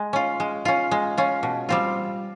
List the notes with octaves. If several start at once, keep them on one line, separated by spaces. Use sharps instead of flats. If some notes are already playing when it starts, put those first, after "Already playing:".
Already playing: G#3
C#4 F4
G#3
C#4 F4
G#3
C#4 F4
B2
G3 C4 F4